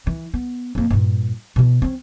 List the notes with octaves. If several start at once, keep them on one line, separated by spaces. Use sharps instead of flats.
E3
B3
F2 A#3
G2 A#2
B2 E3
C4 C#4